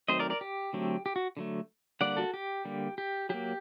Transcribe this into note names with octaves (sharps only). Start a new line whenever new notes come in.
D#3 F#3 A3 C4 C5 D#5
A#4 D5
A#4 D5
G4
D3 F#3 A3 C4
G4
F#4
D3 F#3 A3
D3 G3 A#3 D5 F#5
F#4 A4
G4
D3 G3 A#3
G4
F#3 A#3 G4